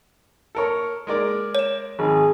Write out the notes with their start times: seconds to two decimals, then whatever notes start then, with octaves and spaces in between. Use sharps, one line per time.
0.55 A4 A#4 C#5
1.07 G#3 A#4 D5
1.55 C#5 E7
1.99 G#1 G#4